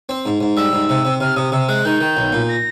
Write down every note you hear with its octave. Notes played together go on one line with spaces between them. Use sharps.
C4
G#2
G#2
G3 E6
G#2
C3
C3
C3 F6
C3 D#6
C3 E6
G#3 F#6
D#3 G6
D#3
B1
A#2
A#6